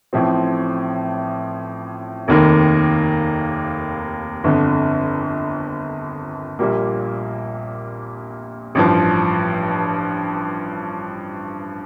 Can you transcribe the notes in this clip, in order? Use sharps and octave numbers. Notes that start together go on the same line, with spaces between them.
A1 A2 F3 C4
F1 D#2 D#3 A#3
G1 F2 D3
A#1 A#2 G3 A#3
A1 G2 F3